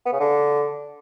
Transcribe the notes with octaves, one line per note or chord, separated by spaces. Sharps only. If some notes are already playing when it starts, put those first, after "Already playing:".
B3
C#3
D3